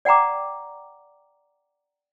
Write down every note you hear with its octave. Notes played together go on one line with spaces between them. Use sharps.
D5 F#5 G5 A#5 D6